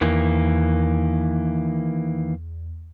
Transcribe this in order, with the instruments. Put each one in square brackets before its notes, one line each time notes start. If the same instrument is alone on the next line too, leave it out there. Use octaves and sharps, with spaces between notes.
[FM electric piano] E2 [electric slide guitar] D#3 E3 A#3